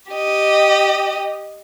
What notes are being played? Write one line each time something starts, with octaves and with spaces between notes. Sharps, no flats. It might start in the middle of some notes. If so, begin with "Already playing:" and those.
G4 D#5